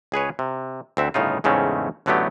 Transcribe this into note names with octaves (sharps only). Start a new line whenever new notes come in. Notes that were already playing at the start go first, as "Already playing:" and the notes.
C#2 G#4 B4 C#5
C3
D2 C4 E5 F#5
G1 A2 C#3 D#4 F4
E2 G#2 C#3 A3 C4 C#4
A1 D3 F#3 A3 B3 G4